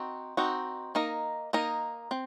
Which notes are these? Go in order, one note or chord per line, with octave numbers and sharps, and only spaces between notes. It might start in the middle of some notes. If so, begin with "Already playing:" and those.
Already playing: C4 D#4 F#4
C4 D#4 F#4
A#3 D#4 A#4 D#5
A#3 D#4 A#4 D#5
C4